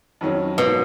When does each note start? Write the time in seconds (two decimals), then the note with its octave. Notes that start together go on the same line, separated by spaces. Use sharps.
0.21 F2 D#3 F#3 C#4
0.57 G#2 B2 F3 A#3 D#4